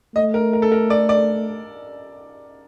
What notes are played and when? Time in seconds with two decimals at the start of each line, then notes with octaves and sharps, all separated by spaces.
0.15 A3 D#5
0.34 A#4
0.53 A#4
0.62 A4
0.72 A#4
0.90 D5
1.09 D5